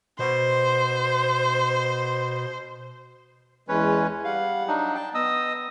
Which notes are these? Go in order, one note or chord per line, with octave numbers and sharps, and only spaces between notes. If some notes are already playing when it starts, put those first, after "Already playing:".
B2 C5
E2 E3 G#3 C#4 B4 C#5
G3 G4 F5 F#5
F#3 D4 D#4
G5 A5
B3 D#5 D#6 E6